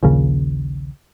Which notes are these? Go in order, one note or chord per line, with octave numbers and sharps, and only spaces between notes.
A#1 D#2 C#3